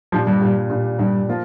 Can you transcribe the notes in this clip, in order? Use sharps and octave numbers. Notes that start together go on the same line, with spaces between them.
A#2 F3 G3 D4
G2
A#2 G3 D4
A#2 G3 D4
G2 A#2 G3 D4
F3 A#3 F4